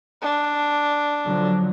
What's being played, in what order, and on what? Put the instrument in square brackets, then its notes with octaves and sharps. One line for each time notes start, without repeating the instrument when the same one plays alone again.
[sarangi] D4
[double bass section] D3 F3 F#3